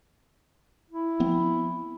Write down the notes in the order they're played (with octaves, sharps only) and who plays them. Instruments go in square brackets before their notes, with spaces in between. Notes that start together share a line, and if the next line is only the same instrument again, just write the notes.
[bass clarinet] E4
[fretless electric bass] F3 B3 C4